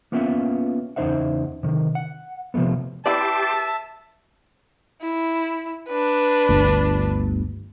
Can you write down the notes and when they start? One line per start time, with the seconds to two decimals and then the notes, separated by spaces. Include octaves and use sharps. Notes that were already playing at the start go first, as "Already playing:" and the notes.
0.12 A#3 B3 C#4 F4 E5 F#5
0.96 E2 C#3 D#4 C5 E5 F#5
1.63 C3 D#3
1.95 F#5
2.54 C3 F3 G3 A3 B3
3.06 E4 G4 B4 D5 E5 A5 C6 D6
5.02 E4
5.88 D4 B4
6.49 G1 D2